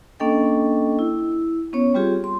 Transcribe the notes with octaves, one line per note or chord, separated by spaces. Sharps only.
A#3 C#4 D4 A4 D#5 G5
E4
B3 C#4 C#5
G3 C4 F4 G4 G#4
C6